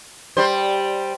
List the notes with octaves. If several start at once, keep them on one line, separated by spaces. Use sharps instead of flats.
G3 C5